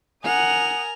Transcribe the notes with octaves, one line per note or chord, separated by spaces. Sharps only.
A#4 F#5 G#5 D#6 F7